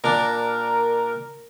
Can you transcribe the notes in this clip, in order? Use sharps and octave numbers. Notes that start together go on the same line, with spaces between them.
A#2 D4 A#4